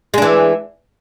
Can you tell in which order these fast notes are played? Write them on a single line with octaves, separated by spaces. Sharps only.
G#3 D4 E3